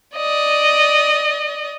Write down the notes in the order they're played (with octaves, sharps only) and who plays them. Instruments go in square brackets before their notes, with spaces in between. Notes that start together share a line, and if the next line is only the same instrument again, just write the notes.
[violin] D5 D#5